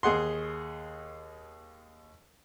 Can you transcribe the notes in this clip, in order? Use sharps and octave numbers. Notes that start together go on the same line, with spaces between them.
D#2 G#4 F#5 C6